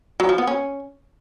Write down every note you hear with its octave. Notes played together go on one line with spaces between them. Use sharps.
F#3
F3
B3
C#4